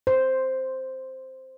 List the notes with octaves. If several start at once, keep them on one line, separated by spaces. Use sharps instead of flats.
C5